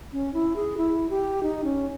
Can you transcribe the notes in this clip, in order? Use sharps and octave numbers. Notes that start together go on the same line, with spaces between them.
C#4
E4
G#4
E4
G4
D#4
C#4